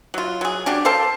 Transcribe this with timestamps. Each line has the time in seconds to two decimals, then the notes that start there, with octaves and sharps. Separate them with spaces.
0.14 F#3 F4
0.41 F#3 G#4
0.66 C#3 D4 F#4 G4
0.85 A4 C5 F5 A5